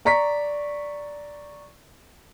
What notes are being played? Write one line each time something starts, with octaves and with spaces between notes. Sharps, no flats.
D5 A#5 C#6 B6